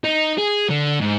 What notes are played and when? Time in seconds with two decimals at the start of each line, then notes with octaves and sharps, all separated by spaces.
0.04 D#4
0.38 G#4
0.69 D3
1.00 G#2